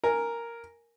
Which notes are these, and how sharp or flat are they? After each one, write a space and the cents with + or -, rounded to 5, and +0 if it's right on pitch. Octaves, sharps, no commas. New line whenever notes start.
A#4 +0 G#5 +0